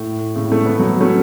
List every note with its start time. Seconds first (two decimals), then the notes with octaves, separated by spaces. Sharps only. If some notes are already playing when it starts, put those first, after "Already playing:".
Already playing: A2
0.36 A2 C#3
0.52 A3
0.66 B3
0.79 F#3 A3
1.01 A3 C#4